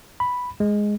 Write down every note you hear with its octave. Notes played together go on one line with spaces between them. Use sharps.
B5
G#3